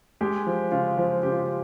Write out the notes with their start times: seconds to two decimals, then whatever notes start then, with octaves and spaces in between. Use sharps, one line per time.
0.21 G#3 G4
0.47 F3
0.72 C#3 F4
0.97 F3
1.23 C#3 G4
1.32 F4
1.39 G4